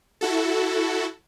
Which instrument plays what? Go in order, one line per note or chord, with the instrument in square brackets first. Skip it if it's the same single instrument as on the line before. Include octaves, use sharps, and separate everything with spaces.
[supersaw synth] E4 F#4 A4